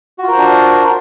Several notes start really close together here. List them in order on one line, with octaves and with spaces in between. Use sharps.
F#4 F4 A#4 C5 D4